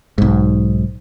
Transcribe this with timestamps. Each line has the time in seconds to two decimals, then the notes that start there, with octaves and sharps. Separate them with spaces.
0.18 B1 G#2